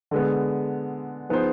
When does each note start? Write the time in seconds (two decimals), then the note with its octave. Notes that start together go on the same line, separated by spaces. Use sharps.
0.11 D3 G#3 B3
1.29 F3 B3 D#4 G#4 C5